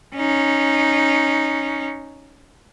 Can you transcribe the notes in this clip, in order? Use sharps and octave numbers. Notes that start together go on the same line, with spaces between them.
C#4 D#4